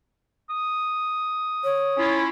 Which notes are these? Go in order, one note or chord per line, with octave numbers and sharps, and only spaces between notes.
D#6
C#5
C#4 E4 F4